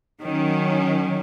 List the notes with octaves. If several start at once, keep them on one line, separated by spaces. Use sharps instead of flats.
D#3 F#3 C#4